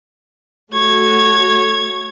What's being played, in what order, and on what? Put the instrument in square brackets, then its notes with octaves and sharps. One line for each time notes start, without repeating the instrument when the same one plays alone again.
[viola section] A3 F#4 [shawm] C#5 [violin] G#6